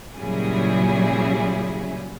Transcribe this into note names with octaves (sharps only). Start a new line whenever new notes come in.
A#2 C#3 F#3 G3 E4 G#4